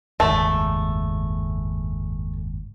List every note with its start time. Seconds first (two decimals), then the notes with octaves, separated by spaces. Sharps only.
0.20 F#1 D#2 G#2 A3